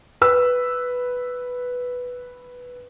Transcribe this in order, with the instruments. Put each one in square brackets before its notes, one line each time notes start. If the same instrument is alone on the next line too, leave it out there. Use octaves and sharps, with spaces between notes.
[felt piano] B4 E6